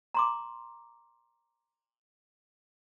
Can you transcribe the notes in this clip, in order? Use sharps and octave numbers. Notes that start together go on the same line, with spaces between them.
A#5 C6 D6